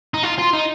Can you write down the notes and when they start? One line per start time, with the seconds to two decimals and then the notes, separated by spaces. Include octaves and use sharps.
0.14 D#4
0.23 F4
0.38 F4
0.53 D#4